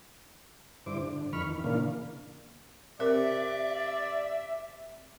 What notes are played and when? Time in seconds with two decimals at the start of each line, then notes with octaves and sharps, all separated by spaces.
0.86 G2 D3 E4 C5 D6
1.02 D3
1.33 F2 D#3 B5 C#6 F6
1.46 D#3 E3
1.64 A#2 C#3 E3 A#3 D4 F5
3.00 C3 A#4 D5 E5